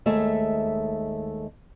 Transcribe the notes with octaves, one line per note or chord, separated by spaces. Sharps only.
D#2 G#3 A3 E5